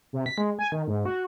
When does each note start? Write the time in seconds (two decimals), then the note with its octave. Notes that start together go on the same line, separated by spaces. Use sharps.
0.13 C3
0.26 B6
0.38 G#3
0.59 G#5
0.72 D#3
0.87 G#2
1.05 F#4